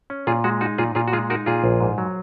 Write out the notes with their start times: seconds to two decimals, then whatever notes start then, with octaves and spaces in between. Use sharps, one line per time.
0.10 C#4
0.27 A#2 F4 G#4
0.44 G#3 F#4
0.61 D#4 F#4
0.78 A#2 F4 G#4
0.95 A#2 F4 G#4
1.08 F#4
1.13 G#3 F4 G#4
1.30 D#4 F#4 A#4
1.46 A#2 F4 G#4
1.64 A#1
1.81 G#2
1.98 F#3